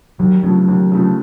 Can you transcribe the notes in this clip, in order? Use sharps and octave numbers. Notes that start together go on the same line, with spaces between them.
D#2 F#3
C#3 F3 F#3 A3
D#2
C#3 F3 A3